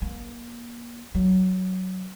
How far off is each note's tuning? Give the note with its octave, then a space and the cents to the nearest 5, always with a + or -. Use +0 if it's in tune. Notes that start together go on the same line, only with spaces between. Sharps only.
A#3 +30
F#3 +10